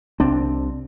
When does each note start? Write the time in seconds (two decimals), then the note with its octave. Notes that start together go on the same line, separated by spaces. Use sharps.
0.20 C2 C4 D4